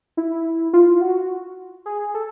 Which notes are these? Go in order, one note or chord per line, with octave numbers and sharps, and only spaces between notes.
E4
F4
F#4
G#4
A4